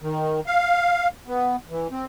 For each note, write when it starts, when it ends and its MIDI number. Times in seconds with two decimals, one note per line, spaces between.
0.02 0.40 51
0.47 1.08 77
1.27 1.56 59
1.70 1.88 52
1.91 2.05 60